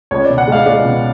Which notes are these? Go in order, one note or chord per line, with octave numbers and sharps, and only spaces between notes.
C#2 C#5
D5
B2
F#5
G#3 F5
G#3 D5
B2